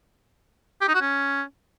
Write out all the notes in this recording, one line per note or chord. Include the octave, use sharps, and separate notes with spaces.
G4
D#4
F#4
C#4